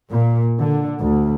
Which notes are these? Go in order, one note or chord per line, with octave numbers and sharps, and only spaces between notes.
A#2
D3
D2